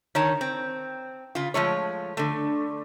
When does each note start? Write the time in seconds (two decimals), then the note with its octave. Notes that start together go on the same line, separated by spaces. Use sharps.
0.15 D#3 C#5 A5
0.41 C4
1.35 C#3 F4
1.54 F3 G#3 A3 C#5
2.17 D3 A3